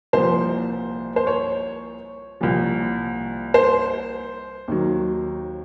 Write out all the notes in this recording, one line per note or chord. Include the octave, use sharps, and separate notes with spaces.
C2 A#2 F3 C5
C5
C#5
C2 A#2 F3
C5
D#2 D#3 F#3